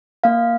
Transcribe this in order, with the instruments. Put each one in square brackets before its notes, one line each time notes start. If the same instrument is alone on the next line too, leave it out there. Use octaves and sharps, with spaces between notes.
[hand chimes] A#3 F5